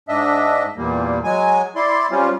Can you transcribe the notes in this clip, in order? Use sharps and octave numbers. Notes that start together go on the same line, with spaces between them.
G#2 D4 D#5 E5
E2 A#2 G3 A#3
F#3 G#3 G#5
E4 D5 C6
G3 C4 C#4 F4